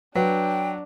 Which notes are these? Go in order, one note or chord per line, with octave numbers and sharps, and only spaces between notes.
F#3 D4 B4 F#5 G5